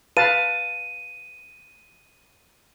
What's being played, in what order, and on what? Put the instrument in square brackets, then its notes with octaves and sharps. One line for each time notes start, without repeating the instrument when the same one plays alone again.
[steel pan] B4 F5 A5 [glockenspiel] D#7